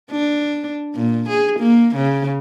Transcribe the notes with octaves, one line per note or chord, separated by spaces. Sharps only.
D4
A#2
G#4
A#3
C#3